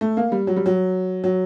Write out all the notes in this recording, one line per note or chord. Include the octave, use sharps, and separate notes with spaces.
A3
A#3
G3
F#3
G3
F#3
F#3